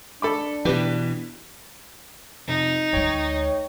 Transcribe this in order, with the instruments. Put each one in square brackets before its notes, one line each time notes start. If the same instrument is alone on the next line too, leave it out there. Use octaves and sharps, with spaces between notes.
[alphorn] D4 [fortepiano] A4 B5 D6
[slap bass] B2 E3 [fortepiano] G4 B4 G5
[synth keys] F2 C3 [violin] D#4
[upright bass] D2 G#3 [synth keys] C#5 G5 C#6